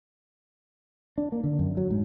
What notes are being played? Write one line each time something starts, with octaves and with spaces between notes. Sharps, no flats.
D4
A#3
D3
F#2
F#3
G#2